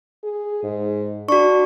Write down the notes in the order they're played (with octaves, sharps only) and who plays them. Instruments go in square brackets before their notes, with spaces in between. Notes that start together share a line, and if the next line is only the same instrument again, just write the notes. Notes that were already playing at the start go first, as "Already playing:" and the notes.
[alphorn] G#4
G#2
[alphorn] D4 [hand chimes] F#4 C#6